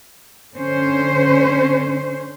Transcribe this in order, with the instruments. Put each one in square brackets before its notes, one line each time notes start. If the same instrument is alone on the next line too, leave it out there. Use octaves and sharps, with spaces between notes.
[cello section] D3 C#4 C5